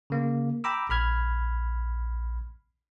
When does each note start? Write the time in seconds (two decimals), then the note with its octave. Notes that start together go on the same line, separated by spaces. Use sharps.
0.10 C#3 A#3
0.64 G5 A#5 B5 D6 E6
0.89 A#1 B5 F6 G#6